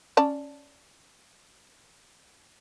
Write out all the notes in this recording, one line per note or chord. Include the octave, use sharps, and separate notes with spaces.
C#4 D5 A5